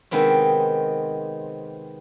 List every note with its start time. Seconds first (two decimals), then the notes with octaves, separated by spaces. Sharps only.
0.11 C3 D#3 G#3 B3 C4